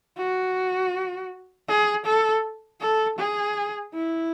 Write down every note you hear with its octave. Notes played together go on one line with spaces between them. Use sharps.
F#4
G#4
A4
A4
G#4
E4